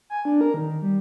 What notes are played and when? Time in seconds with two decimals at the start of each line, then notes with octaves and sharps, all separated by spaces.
0.10 G#5
0.25 D4
0.41 A#4
0.54 D#3
0.82 G3